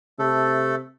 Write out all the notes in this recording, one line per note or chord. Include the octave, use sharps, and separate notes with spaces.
C3 A3 A4